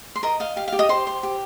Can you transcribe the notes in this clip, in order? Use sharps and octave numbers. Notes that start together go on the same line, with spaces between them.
C6
A#4 D#5 A#5
D#5 F5
G4 F5
F5
G4
D#5 D#6
G4 C5 C6
C5
G4